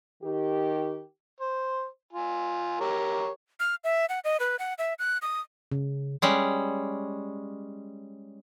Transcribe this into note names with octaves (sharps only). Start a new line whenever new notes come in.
D#3 G4
C5
F4 G#5
G4 A#4 C#5
F6
E5
F#5
D#5
B4
F#5
E5
F#6
D#6
C#3
G3 G#3 C#4